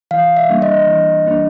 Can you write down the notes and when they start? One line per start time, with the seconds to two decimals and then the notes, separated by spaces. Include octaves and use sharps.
0.11 E3 F5
0.37 E5
0.49 G3 A#3 D4
0.62 D#5
0.87 E3
1.26 G3 A#3 D4